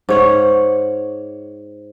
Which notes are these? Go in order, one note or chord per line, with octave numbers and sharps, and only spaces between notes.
G#2 C#5 F#5